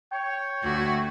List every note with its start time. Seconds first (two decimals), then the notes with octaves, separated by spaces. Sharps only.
0.12 C#5 G5
0.63 D2 A3 D4 E4 F#4